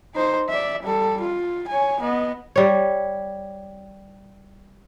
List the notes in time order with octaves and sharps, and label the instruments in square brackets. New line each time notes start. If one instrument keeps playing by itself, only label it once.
[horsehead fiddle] D#4 C5
D5 E5
G3 A4
F4
C#5 G#5
B3 D#5
[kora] G3 C#5